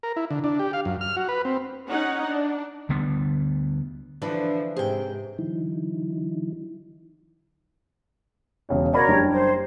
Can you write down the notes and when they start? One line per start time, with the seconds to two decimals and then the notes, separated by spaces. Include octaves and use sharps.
0.03 A#4
0.16 E4
0.31 D3
0.44 D4
0.59 G4
0.73 F5
0.85 F#2
1.01 F6
1.17 F#4
1.29 B4
1.45 C4
1.87 C#4 D#4 F#5
2.26 D4
2.89 D2 D3 G3 B3
4.22 D3 E3 F3 D4 B4
4.76 G#2 C3 G#4 G5
5.38 D3 E3 F#3 D#4 E4
8.69 E1 C#3 C#5
8.93 F#4 A#4 C#5 D5 B5
9.08 F#1 G3 D4
9.31 C5